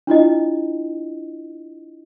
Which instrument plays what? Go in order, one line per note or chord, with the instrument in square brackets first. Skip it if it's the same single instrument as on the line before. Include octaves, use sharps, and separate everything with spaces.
[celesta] D4 E4 F4 D#5